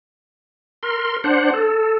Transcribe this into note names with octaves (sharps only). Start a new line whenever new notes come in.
A#4 C6
D4 C5 F#5
A4